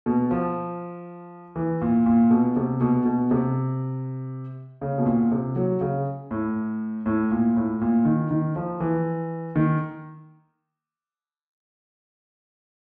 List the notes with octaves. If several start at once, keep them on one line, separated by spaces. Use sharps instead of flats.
B2
F3
E3
A#2
A#2
B2
C3
B2
B2
C3
C#3
B2
A#2
C3
F#3
C#3
A2
A2
A#2
A2
A#2
D#3
D#3
F3
E3
D#3